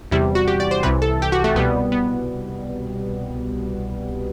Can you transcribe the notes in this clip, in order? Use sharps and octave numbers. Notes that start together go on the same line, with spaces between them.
E2 C3 G3 E4
F#4
G4
D5
C5
C2 C3 E3 B4
A4
G4
F#4
A3
C2 B2 G3 B3
B3